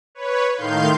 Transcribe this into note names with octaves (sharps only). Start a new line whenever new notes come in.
B4 C#5
A2 D#3 F5 C6 G6